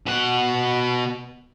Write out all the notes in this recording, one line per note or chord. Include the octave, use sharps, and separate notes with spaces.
B2 F#5